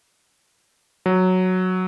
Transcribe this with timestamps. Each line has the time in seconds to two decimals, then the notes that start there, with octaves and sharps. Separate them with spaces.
1.06 F#3